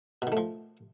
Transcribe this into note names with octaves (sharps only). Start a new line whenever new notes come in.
B2 D#3 F3 A3